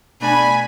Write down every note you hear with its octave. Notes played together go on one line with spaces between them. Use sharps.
B2 A3 D4 G#5 B5